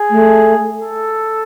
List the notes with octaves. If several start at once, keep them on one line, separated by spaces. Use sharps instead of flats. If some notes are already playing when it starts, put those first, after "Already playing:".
Already playing: G#4
A3
A4